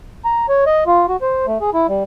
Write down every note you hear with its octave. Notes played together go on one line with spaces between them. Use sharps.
A#5
C#5
D#5
F4
F#4
C5
A3
G#4
E4
G3